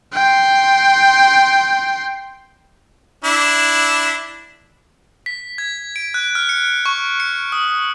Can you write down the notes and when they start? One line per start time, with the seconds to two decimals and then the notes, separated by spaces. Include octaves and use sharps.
0.14 G5 C6
3.24 D4 E4
5.26 B6
5.58 G#6
5.96 D7
6.14 F#6
6.35 F6
6.49 C#7
6.86 C#6
7.20 C#7
7.52 D#6